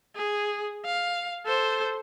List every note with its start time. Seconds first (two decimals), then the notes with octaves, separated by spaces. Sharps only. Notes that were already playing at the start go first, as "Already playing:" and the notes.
0.16 G#4
0.85 F5
1.45 A4 C5